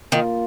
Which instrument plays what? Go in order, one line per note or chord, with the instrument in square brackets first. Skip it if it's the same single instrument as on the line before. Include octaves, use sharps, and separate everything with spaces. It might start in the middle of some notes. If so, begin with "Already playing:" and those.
[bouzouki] D#3 [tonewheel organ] A#3 F4